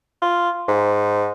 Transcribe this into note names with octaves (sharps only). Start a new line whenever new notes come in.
F4
G#2